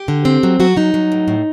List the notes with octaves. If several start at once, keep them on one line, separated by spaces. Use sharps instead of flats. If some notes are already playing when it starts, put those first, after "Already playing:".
Already playing: G4
D3
C4
F#3
F#3 F#4
F#3 D#4
F#3
A2
A2